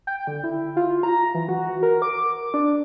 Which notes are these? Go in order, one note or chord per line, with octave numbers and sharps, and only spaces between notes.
G5
D3
E4
F4
A#5
E3
F#4
A#4
D6
D4